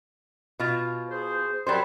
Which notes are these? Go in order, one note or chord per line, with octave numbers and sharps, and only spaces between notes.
B2 F4
G#4 C5
F#3 G3 A#4 C5 B5